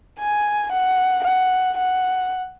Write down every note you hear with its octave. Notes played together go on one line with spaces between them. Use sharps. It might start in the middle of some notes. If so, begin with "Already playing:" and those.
G#5
F#5
F#5
F#5